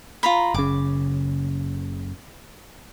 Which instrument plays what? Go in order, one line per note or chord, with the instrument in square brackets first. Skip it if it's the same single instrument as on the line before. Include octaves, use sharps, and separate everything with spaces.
[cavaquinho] F4 A#5 B5
[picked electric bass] F#1 C#3 [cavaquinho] D6